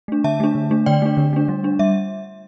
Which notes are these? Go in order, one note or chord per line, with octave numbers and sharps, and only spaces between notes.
A3 D4
D3 E5 A5
A3 D4
D3
A3 D4
D3 D5 G5
A3 D4
D3
A3 D4
G3
D4
G3 E5